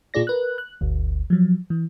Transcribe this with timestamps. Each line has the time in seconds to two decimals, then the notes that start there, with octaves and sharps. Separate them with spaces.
0.14 A#2 F4 G#4 D5 A#6
0.27 A#4 B4 F#6
0.58 F#6
0.81 G1 D2
1.30 F3 F#3
1.70 E3